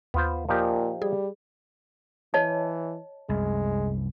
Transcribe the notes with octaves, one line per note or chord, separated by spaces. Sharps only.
D#2 B3 F4 C5
A#2 F3 D#4 G4
G3 G#4
E3 C#5 D#5 A5
C2 F#2 G#3